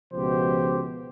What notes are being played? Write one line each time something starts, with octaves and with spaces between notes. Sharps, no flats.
C#2 B2 F3 G4 C5